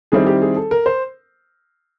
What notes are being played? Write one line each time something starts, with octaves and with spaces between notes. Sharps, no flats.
D#3 G3 C4 E4 G#4
G4
G#4
A4
A#4
C5